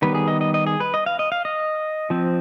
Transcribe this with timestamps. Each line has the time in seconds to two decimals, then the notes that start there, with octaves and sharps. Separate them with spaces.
0.02 D#3 G3 B3 B4
0.15 G#4
0.28 D#5
0.41 D#5
0.54 D#5
0.67 G#4
0.80 B4
0.94 D#5
1.06 F5
1.19 D#5
1.32 F5
1.45 D#5
2.10 F3 C4